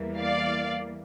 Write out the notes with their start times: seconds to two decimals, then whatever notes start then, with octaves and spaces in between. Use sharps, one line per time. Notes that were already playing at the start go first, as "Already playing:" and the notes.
Already playing: E2 E3 G3 A#3
0.18 D5 F5